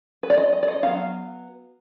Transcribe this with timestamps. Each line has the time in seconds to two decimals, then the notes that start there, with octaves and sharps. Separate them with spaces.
0.23 B4
0.30 D5
0.38 D#5
0.53 D#5
0.63 D5
0.68 D#5
0.83 F#3 B3 D#4 F5